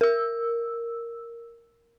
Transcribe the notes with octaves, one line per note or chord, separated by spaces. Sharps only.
A#4 E6